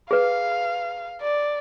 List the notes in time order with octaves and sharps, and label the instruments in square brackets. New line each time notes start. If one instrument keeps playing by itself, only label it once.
[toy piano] G#4 B4 [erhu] F5
[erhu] D5